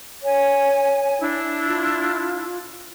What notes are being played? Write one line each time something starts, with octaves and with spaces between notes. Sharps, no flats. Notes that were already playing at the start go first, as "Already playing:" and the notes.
C#5 G#5
D4 E4
F4